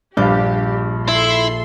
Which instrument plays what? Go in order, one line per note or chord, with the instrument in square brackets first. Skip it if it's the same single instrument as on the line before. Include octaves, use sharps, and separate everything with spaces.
[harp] A#1 D5 G6 [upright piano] G2 F5 [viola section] G4
[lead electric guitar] E4 [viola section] A4 C6 [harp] E6